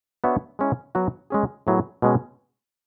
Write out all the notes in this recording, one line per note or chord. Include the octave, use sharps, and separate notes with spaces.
B3 D4 F#4 C#5 E5
G#3 C#4 E4
F#3 B3 F#4
G#3 C#4 G#4
A2 F#3 B3 E4 G#4
B2 G#3 C#4